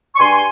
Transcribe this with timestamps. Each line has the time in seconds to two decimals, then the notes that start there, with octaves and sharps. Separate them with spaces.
0.15 C#6
0.19 G2 G#5 C6